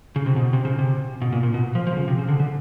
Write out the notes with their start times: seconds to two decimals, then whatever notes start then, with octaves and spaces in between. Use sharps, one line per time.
0.16 C#3
0.26 C3
0.36 B2
0.53 C3
0.65 C#3
0.79 C3
1.22 B2
1.32 A#2
1.43 A#2
1.54 B2
1.75 F3
1.87 F3
1.93 D3
1.97 C#3
2.08 C3
2.19 C#3
2.28 D3
2.40 D3